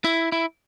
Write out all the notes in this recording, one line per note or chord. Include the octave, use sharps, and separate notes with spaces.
E4
E4